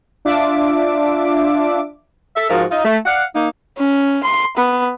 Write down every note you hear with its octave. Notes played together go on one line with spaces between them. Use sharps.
D4 F4 E5 D6
A4 E5
G#2 F3 F#4 A#4 F5
D#4 F4
A3
D5 F5 F#5
A#3 D#4
C#4
C6
B3